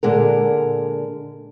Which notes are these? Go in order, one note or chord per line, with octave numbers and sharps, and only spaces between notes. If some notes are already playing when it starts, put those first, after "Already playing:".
A#2 D3 G#3 A#4